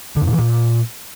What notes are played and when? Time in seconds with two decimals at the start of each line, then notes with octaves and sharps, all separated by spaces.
0.16 D3
0.22 F2
0.27 A#2
0.33 E3
0.38 A#2